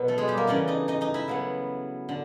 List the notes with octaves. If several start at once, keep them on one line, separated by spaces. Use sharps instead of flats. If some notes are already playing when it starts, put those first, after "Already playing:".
Already playing: B2 F#3 B3
A3 A4
G#3 G#4
G3 G4
A#3 A#4
C#3 E3 A3 C#4 D4 D5
D#4 D#5
D#4 D#5
D#4 D#5
E4 E5
C#3 F#3 B3
D3